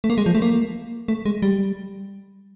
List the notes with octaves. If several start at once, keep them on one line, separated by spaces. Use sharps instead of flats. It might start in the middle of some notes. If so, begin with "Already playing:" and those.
A3
A#3
G#3
F3
A3
A#3
A3
G#3
G3